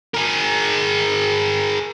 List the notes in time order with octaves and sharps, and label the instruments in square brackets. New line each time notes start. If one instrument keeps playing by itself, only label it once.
[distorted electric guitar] G#4 A#4